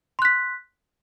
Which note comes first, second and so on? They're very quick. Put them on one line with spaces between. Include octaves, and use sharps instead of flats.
C6 F#6 B6